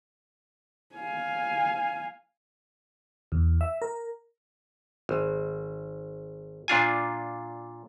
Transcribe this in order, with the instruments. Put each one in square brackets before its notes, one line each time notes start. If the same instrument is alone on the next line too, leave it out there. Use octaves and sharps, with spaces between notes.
[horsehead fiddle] F5 G#5
[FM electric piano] E2
E5
A#4
[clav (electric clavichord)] G#1
A#2 D4 F4 G#5